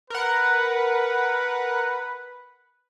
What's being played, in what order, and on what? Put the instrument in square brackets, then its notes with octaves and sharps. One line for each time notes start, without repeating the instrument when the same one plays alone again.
[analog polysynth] A#4 F#5 [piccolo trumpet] B4